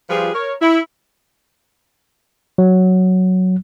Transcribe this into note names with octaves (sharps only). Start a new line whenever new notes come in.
F3 G3 F4 G#4 B4
A#4 C#5
E4
F#3